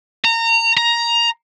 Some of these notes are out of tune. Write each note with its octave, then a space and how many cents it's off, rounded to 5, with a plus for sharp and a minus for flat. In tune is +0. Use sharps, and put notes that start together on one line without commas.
A#5 -25
A#5 +10